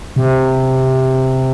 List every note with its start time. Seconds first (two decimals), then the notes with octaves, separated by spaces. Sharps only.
0.16 C3